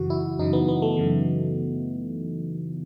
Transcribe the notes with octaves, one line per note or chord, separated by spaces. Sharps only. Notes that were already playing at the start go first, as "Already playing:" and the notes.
Already playing: F#2 C#3 E3 F#4
E4
F#2 C#3 E3 D#4
B3
B3
A3
F#2 C#3 E3